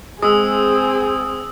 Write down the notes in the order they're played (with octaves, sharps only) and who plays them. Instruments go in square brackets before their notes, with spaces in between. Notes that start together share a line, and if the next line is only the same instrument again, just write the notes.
[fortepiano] G#3 [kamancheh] C4 G#4 [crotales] D#6 E6